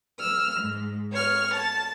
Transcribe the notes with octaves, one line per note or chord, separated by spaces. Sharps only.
E6 F6
G#2
C#5 F6
A5